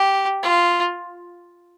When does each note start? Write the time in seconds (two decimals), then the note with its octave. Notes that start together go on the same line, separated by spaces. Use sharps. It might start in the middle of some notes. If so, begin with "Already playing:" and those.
Already playing: G4
0.43 F4